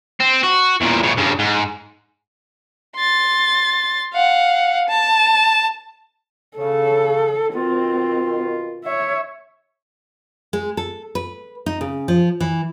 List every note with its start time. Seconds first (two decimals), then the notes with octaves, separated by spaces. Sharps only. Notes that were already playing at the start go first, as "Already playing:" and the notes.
0.20 C4
0.43 F#4
0.81 E2 A#2
1.03 A2 C#3
1.17 G2 C#3
1.39 G#2
2.96 C6 A6
4.13 F5 F#5
4.89 A5
6.58 C#3 A4
7.55 B2 D#3 C4 F4
8.84 C#5 E5
10.53 G#3
10.77 A4
11.15 B4
11.66 D#4
11.81 C#3
12.08 F3
12.40 E3